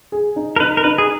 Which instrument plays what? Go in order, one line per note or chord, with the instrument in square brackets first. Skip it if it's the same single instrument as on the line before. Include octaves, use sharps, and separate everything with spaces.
[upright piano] G#4
D#4
[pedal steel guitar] A#4
[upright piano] D#4 [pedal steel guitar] B4
[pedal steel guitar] A#4
[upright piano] D#4 [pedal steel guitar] B4
[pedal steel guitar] G#4